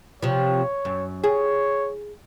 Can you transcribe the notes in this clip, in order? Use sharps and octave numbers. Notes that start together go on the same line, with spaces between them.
C3 F3 C#5
F#2
G#4 C#5